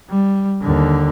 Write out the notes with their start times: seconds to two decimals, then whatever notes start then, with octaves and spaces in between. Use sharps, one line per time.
0.10 G3
0.61 D#2 D3